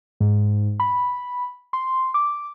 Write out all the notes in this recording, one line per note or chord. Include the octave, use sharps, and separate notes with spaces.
G#2
B5
C6
D6